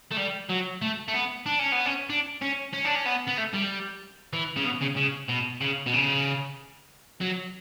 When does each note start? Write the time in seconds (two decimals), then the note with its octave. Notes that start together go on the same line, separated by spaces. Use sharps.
0.12 A3
0.17 G3
0.50 F#3
0.82 A3
1.08 A3
1.14 B3
1.46 D4
1.59 C#4
1.72 B3
1.86 C#4
2.10 D4
2.41 C#4
2.73 C#4
2.85 D4
2.95 C#4
3.05 B3
3.27 B3
3.37 A3
3.54 G3
4.33 E3
4.57 C#3
4.65 B2
4.82 C#3
4.97 C#3
5.29 B2
5.61 C#3
5.87 B2
5.93 C#3
7.21 F#3